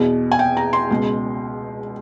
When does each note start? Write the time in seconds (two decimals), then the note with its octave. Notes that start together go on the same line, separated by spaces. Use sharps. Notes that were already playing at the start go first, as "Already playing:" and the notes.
Already playing: E2 B2
0.32 G#5
0.39 G5
0.57 A#5
0.73 C6
0.90 C#2 B2